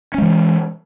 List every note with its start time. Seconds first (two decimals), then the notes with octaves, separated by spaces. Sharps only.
0.14 C#4
0.18 G#3
0.22 E3